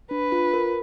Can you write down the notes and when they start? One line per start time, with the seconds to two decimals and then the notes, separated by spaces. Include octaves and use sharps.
0.11 D4 B4
0.32 F4
0.53 A#4